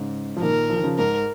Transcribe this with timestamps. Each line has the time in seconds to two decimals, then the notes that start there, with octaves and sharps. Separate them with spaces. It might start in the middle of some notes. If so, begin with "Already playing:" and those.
Already playing: G#2 C#3
0.37 F3
0.41 A#2 D#3 A#4
0.69 F3
0.77 D#3
0.84 C#3 F3
0.98 G#2 A#4